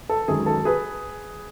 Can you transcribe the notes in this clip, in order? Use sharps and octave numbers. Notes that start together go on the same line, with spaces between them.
A4
F#2 D#3 G#3 D#4 G#4
A4
G#4 B4